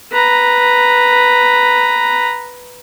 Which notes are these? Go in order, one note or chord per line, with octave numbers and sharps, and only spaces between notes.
B4 A#5